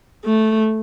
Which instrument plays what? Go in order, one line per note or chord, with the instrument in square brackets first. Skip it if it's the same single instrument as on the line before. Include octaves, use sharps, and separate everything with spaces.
[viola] A3